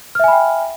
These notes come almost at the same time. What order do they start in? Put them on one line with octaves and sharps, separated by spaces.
F6 E5 G#5 B5 G5